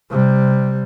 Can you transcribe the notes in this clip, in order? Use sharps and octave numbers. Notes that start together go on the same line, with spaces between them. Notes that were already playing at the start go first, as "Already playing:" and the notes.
C3 G3